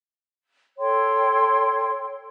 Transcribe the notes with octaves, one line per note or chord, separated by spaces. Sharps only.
A4 C#5 G5 C6